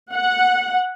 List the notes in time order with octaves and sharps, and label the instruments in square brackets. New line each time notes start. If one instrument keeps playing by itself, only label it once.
[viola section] F#5